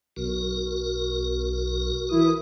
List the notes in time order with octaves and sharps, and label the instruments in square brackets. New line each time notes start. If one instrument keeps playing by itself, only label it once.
[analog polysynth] B1 [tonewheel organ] F#4 A#4
[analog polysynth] E3 E4 D#6